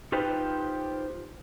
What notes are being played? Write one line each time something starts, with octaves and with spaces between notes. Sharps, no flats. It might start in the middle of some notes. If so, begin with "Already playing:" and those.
D#4 F4 G4 B4 C5